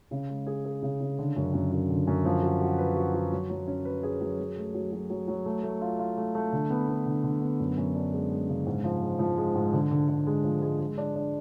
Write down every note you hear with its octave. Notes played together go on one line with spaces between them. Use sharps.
C#3
G#3
G#4
G#4
C#3
C#3
D3
F#2
F#2
F#2
D3
F#2
F3
F#4
F#4
B4
F#4
F#4
F#3
F#3
C#4
B4
G#4
F#3
F#3
A3
F#3
F#3
F#3
F#3
A3
A3
F4
F4
A3
A3
D3
B3
B3
D3
D3
B3
F#2
F#2
D4
G#3
G#3
C#3
G#2
F3
G#3
F3
G#3
G#2
D3
D3
D3
G#3
F3
G#3
G#3
D4
D4